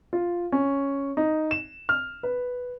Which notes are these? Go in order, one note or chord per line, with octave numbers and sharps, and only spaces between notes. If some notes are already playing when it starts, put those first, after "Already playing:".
F4
C#4
D#4
E7
F6
B4